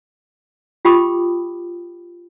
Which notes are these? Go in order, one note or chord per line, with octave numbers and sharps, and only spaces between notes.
F4 G4 G5 B5 D6 D#6